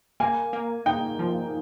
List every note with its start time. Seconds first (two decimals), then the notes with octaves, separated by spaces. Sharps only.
0.20 A#3 G#5
0.53 A#3
0.86 D#4 G5
1.19 F3